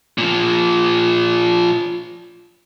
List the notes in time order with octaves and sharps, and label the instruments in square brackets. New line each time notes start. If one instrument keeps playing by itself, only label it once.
[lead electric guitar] A#2 F3